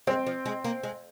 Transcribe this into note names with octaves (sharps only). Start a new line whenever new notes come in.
G#3 C4
F3
G#3
A#3
G#3